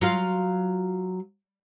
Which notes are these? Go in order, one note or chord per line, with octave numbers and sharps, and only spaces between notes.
F#3 F4 F5